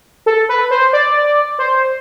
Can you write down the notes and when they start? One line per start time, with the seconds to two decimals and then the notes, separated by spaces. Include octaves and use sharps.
0.26 A4
0.49 B4
0.71 C5
0.93 D5
1.59 C5